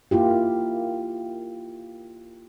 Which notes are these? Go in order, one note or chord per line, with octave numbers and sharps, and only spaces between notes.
A#3 E4 F4 G4